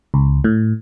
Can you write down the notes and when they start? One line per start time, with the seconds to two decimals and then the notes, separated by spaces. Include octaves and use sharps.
0.14 C#2
0.44 A2